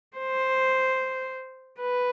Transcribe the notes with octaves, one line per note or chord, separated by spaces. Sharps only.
C5
B4